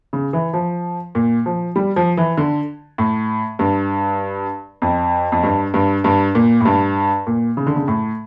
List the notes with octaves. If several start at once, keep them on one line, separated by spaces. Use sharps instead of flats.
C#3
E3
F3
A#2
F3
G3
F3
E3
D3
A2
G2
F2
F2
G2
G2
G2
A#2
A2
G2
A#2
C#3
D3
C#3
A2